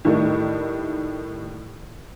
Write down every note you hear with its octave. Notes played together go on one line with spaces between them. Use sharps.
A2 D#3 G3 A3 D#4